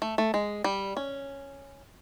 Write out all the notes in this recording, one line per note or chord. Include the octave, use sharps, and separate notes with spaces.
A3
A3
G#3
G3
C#4